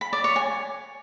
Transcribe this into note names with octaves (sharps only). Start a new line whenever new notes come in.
B5
D5
C#5
G#5